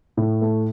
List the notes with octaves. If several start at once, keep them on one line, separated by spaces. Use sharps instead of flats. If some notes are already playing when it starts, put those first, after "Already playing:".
A2
A3